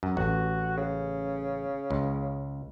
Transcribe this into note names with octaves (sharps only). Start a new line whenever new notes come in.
F#2
A1 F#4
C#3
C#2